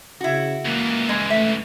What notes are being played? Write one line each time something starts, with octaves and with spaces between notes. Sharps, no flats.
C#3 E4 F#4
C#2 E3 A#3
G#3
A3 E5